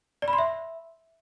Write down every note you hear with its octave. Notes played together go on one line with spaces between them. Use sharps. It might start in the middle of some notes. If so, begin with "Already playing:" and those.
D5
B5
C6
E5